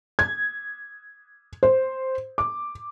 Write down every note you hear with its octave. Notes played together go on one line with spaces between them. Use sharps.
G#6
C5
D6